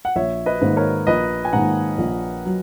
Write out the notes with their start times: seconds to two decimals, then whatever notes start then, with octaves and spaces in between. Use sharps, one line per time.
0.05 F#5
0.16 A#1 C#5 E5
0.46 B4 D#5
0.61 G#2 D#3 A#3
0.77 A#4 C#5
1.07 A#1 B4 D#5
1.45 G#5
1.53 G#2 D#3 A#3 F#5 A#5
1.98 A#1
2.45 F#3